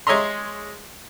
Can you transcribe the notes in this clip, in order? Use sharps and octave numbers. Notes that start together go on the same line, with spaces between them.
G#3 C#5 D#5 E5 A#5 C6